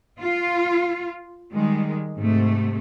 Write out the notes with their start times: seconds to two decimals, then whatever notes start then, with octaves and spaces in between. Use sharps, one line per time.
0.20 F4
1.51 D#3 G3 G#3
2.17 G#2 C3 A3